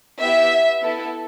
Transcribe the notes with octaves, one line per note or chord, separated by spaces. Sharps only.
B3 E4 G4 E5
B3 E4 A4